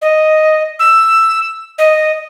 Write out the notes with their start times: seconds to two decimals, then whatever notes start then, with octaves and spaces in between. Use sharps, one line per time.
0.02 D#5
0.79 E6
1.78 D#5